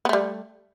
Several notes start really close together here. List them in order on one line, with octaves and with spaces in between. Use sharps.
B3 A3 G3